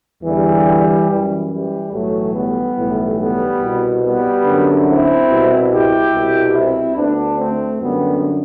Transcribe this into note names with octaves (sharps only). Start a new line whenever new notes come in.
E2 D3 E3 G3
F#2 E3
E3 G3
B1 A2 E3 F#3 A3
G3 B3
B1 A2 E3
G3 B3
C2 B2
G3 B3
F#2 D3
C4 E4
C2 B2
E4 G4
C2 B2
C4 E4
D2 D3 B3 D4
A3 C4
F#2 D3 G3 B3